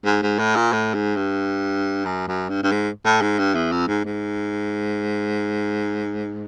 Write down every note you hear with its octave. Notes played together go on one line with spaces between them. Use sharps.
G#2
G#2
A2
A#2
A2
G#2
G2
F#2
F#2
G2
G2
G#2
A2
G#2
G2
E2
F2
G#2
G#2